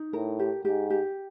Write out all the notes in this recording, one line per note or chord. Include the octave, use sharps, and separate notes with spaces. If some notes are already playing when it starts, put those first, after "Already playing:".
Already playing: D#4
A2 A#4
G4
G#2 G4
G4